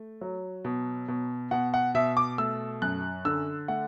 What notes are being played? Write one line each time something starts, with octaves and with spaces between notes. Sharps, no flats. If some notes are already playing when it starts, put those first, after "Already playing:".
Already playing: A3
F#3
B2
B2
B2 F#5
F#5
B2 E5
D6
A3 E6
F#2 F#6
D3 E6
A3 F#5